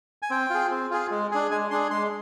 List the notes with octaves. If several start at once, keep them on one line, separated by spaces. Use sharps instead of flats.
G#5
C4 G5
F4 G#4
C4
F4 G#4
G#3
D4 G#4
G#3 G#5
D4 G#4 C6
G#3 C6